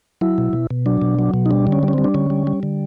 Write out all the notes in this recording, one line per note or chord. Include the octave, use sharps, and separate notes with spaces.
F#3 E4
B2
B2
B2
F#3 D4
B2
F#3
B2
D#4
G3 D4
D3
C#4
G3
C#4
G3 C4
D4
D3 C#4
G3
G3
D3